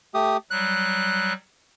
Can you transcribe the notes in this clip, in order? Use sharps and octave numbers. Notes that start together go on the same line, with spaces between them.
A3 G4 D#6
F#3 G3 F#6